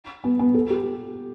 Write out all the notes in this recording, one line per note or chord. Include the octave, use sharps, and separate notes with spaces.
B3
B3
A4
G4